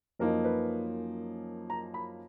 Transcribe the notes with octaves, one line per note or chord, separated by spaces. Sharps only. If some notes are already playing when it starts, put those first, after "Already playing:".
F#2 F3 A#3 D#4 A#4
B4
A#5
B5